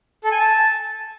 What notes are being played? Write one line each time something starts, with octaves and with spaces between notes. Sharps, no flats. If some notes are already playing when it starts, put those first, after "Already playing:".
A4
G#5
A5